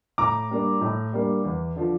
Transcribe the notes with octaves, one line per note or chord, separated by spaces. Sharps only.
A2 A#5 D6
G3 A#3 D4
A2
G3 A#3 D4
E2
D3 F3